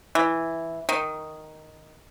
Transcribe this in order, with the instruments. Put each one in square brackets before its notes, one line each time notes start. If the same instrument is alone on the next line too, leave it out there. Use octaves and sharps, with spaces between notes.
[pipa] E3
D#3